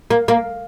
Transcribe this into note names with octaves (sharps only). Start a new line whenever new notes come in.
A#3
A#3